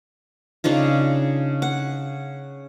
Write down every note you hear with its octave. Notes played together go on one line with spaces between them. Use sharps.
C#3 D4 D#4 F4
F#5